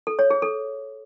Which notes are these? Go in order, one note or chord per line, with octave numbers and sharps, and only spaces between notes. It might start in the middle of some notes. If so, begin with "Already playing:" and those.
A4
C#5
G#4
A4